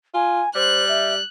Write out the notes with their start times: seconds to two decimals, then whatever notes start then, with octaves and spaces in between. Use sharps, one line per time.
0.14 F4 G#5
0.55 G3 C5 F#6
0.88 E5